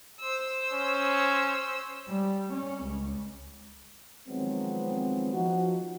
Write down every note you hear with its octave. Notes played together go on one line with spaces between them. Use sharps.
C5 E6
C#4
G3
C#4
C#2
D#3 F3 F#3 G#3 B3 C4
F3 D#4 F#4